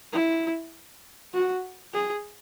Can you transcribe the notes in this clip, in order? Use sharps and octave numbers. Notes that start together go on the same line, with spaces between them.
E4
F#4
G#4